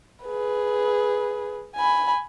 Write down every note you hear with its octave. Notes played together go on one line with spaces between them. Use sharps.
G#4 B4
G#5 B5